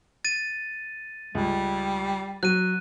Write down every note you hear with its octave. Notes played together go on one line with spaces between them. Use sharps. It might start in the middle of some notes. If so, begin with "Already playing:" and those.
A6 D#7
C#2 G3
F#3 F#6 D#7